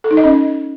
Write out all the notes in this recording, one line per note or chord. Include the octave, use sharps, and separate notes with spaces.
A4
D#4
D#5
C#4